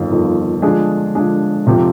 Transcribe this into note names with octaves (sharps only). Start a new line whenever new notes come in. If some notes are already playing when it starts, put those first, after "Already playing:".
Already playing: G1 F2 D#3
G1 F2 D#3
D3 F3 G#3 D4 G#4
D3 F3 G#3 D4 G#4
F2 C3 F3 C4 G4